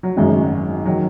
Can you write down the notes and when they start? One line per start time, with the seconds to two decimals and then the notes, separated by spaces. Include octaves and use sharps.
0.03 F#3
0.16 G#1 F#2 C#3 G#3
0.85 D#3 F#3